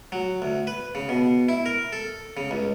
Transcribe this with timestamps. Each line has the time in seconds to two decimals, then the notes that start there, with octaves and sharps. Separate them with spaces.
0.12 F#3
0.42 D2
0.67 B4
0.95 C#3
1.09 B2
1.49 E4
1.66 A#4
1.93 A4
2.37 C#3
2.51 C#2